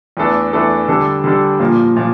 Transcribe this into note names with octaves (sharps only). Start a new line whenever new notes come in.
E2 E3 A3 D4 A4
E2 E3 A3 D4 A4
D3 G3 D4 A4
D3 G3 D4 A4
A#2 F3 A#3
A#2 F3